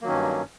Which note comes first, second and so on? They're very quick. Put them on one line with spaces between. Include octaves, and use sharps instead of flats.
A#3 F#3 D#3 C#4 G2